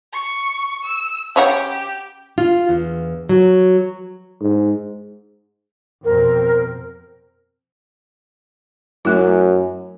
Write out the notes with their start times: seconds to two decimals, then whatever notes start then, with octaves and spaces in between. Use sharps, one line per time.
0.13 C#6
0.84 E6
1.36 C#3 G4 C#5 F#5
2.38 F4
2.69 E2
3.29 F#3
4.41 G#2
6.04 F2 B2 C4 A#4
9.05 F#2 A3 E4